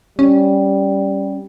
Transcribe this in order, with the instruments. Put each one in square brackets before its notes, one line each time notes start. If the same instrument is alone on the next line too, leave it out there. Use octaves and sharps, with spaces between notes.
[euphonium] G3 [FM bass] C#4